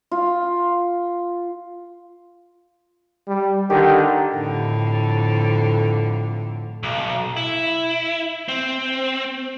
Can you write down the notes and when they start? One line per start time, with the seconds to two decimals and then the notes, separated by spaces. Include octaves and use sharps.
0.11 F4
3.28 G3
3.70 D3 D#3 G4
4.35 F2 A2 D3
6.83 B1
7.37 E4
8.48 C4